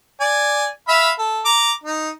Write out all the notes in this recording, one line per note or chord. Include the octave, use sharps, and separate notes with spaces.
D5 G#5
E5 F5 B5
A4
A#5 D6
D#4